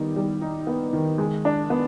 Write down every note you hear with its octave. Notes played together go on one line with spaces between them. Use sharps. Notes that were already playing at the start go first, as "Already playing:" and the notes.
Already playing: D#3 G3 B3 D#4
G3
D#4
B3
D#3
G#3
D4
B3